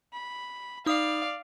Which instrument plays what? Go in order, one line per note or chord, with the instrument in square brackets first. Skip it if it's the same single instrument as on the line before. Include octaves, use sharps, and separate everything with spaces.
[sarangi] B5
[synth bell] D#4 D#6 [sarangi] D5 [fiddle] F5